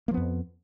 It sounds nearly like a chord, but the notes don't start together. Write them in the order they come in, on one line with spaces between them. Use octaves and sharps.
A#3 F3 B3 F2